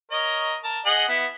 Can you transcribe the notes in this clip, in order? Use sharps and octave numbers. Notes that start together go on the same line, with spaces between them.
A#4 C#5 D#5
A#4 A5
G#4 D#5 F#5
B3 E4